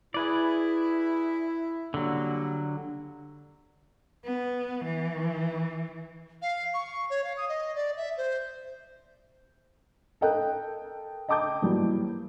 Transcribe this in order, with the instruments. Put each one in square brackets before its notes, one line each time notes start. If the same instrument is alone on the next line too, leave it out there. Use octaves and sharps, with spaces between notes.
[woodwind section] E4 [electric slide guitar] G#4 B4 D5
[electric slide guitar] D3 F#3 [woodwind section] G3 A#3
[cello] B3
E3
[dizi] F5
C#6
C#5
F5
D#6
D#5
D5
E5
C5
[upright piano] A4 A#4 D#5 G5 A5 F#6
D#5 G5 A5 D6 D#6 G6
E3 F#3 G3 A#3